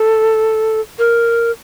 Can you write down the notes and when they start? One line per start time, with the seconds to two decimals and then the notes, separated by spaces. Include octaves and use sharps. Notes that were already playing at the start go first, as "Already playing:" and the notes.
Already playing: A4
0.99 A#4